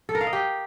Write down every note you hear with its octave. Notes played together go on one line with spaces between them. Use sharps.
A4
A#4
F5
D#5
G4